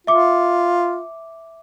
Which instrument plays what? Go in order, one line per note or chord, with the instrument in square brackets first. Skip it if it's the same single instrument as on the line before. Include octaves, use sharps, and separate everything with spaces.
[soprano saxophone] F4 [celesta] E5 D6 C#7